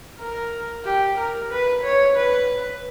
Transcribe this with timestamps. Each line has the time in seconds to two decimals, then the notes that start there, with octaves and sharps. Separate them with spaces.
0.20 A#4
0.86 G4
1.18 A#4
1.51 B4
1.84 C#5
2.17 B4